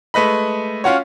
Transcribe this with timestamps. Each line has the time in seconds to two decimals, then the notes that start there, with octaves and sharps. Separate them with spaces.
0.14 G#3 A3 B4 D#5 B5
0.84 C#4 F4 F#4 C#5